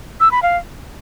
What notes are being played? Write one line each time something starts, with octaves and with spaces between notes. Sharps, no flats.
E6
B5
F5